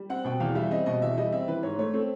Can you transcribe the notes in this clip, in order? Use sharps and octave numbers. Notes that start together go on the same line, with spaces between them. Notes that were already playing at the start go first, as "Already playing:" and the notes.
Already playing: G3
C4 F#5
B2 G5
E2 F5
G3 E5
C4 D#5
B2 D#5
E2 E5
G3 D#5
C4 E5
E3 B4
G#2 C#5
A3 C#5
C4 A4